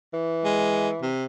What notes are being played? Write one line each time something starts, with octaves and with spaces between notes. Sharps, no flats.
E3
G#3
C3